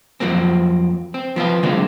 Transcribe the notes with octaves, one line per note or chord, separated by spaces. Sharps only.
F2 F3 F#3 A#3 C4
C4
F3 B3 C4 F4
D3 F#3 G#3 A#3 C4 D4